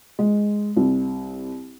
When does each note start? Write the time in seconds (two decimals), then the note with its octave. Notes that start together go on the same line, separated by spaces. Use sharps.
0.19 G#3
0.76 C2